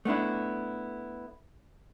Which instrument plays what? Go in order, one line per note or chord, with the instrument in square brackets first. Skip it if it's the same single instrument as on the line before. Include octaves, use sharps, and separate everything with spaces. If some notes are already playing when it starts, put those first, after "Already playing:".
[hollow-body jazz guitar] A3 B3 D4 E4